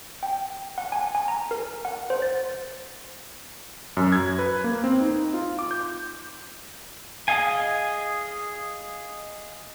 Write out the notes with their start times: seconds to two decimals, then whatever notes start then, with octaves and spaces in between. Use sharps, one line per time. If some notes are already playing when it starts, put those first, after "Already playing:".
0.23 G5
0.78 F#5
0.92 G#5
1.15 G#5
1.28 A#5
1.51 A#4
1.85 F#5
2.10 C5
2.22 A6
3.97 F#2
4.12 G#6
4.39 B4
4.64 A#3
4.84 C4
5.00 D#4
5.34 F4
5.59 D6
5.71 G6
7.28 G#4 D#5 F5 G#5